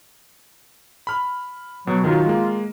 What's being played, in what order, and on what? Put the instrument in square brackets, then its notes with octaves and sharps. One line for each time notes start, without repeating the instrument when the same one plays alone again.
[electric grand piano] B5 F6
[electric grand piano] B2 [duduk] F#3
[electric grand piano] D#3 F#3 [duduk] F4
[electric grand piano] G#3 A#3